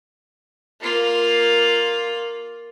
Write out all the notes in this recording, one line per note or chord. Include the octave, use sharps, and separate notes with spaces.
A#3 F4